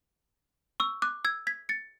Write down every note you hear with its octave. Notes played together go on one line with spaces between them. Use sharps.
C#6 E6
D6 F#6
E6 G#6
G#6 B6
A6 C#7